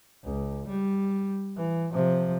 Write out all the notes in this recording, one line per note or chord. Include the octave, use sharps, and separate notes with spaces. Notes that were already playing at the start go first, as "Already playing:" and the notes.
C#2
G3
E3
C3 F3